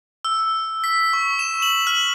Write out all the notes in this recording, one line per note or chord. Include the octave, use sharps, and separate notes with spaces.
E6
B6
C#6
E7
F#7
F6